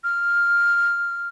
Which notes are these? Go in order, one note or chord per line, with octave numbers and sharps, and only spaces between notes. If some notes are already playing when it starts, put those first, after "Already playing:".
F6